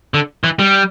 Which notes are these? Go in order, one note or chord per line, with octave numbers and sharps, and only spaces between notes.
D3
E3
G3